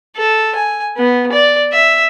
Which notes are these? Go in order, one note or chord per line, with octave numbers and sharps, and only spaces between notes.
A4
G#5
B3
D5
E5